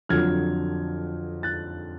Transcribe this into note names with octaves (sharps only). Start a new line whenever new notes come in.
F2 D3 F#3 F6 G#6
F#6 A6